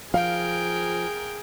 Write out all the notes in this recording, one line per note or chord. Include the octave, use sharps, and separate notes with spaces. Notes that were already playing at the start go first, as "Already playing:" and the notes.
F3 G#4 A#4 F5 G5